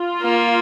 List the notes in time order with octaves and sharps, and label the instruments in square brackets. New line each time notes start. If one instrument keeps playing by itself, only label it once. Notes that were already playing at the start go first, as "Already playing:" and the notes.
Already playing: [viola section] F4
[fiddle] A#3